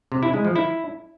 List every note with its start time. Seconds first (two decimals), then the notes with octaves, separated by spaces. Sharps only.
0.12 C3
0.23 E4
0.34 G#3
0.45 F3
0.56 E4